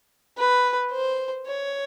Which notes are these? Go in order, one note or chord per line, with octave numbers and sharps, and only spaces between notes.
B4
C5
C#5